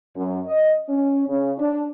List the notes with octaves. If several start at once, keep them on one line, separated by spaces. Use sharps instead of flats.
F#2
D#5
C#4
C#3
D4